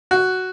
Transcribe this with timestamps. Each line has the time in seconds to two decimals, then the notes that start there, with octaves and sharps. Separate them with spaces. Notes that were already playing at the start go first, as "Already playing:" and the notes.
0.11 F#4